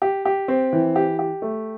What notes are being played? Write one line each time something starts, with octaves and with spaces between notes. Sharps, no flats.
G4
G4
C4
E3
G4
G4
A3